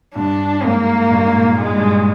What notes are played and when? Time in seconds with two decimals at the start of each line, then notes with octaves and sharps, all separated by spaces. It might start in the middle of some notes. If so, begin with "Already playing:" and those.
0.15 G2 D4
0.63 G#2 A#3
1.11 G2
1.23 G#2
1.34 A#2
1.58 G#2 G#3
1.74 G2